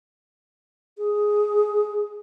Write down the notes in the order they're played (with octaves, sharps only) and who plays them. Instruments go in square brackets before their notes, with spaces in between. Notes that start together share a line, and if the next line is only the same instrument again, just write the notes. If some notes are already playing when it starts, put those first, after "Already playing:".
[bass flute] G#4